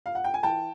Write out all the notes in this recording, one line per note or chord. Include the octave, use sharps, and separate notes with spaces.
F5
F#5
G5
G#5
E3 G5 A5